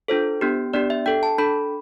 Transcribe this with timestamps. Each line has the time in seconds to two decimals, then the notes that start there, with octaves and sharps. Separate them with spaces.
0.08 D4 F4 A4 C5
0.41 B3 D4 G4
0.74 B3 D4 G4 D5
0.90 E5
1.06 D4 A4 G5
1.23 A5
1.38 D4 A4 B5